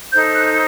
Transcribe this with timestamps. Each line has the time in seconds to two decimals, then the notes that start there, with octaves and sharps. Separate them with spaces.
0.13 D#4 A4 C5 G6
0.35 F#6